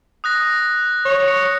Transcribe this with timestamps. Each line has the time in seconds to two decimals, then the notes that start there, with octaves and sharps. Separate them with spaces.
0.24 D#6 F#6 A#6
1.05 C#5
1.28 C#7